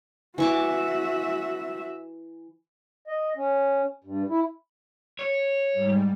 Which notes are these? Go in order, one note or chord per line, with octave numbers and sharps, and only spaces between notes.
E3 F#4 E5 C#6 D6
D#5
C#4
G2
E4
C#5
G#2 G3